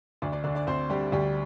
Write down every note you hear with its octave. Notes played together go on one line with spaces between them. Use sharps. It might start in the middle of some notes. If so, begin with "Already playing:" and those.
D2 D4 D5
D4 D5
D3 D4 D5
D4 D5
D2 C4 C5
D3 G3 G4
D2 G3 G4